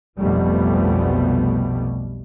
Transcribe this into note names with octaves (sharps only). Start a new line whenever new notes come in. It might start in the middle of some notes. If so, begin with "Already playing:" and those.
F1 B1 B2 G3 A3 B3